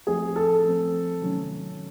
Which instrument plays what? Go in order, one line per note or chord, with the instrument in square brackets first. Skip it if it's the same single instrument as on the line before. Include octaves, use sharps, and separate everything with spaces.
[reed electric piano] F3 A3 C4 [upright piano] G#4
[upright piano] A4
[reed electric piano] F3 A3 C4
C3 D#3 F#3 A3 C#4